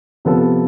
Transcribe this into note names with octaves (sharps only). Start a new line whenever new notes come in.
C3 F3 B3 F4 A4